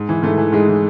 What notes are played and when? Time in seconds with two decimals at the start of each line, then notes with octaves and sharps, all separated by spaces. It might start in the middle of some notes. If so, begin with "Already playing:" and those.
Already playing: G#2
0.09 E3
0.23 G#2 A3
0.38 E3
0.52 G#2 G#3
0.68 E3